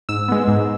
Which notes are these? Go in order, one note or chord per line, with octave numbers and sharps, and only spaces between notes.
G#2 E6
G#3 B3
G#2